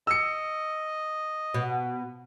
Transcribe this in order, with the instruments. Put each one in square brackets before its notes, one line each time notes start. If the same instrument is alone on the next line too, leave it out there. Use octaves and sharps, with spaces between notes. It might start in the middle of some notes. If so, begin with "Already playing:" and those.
[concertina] D#5 [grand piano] E6 C#7
[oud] B2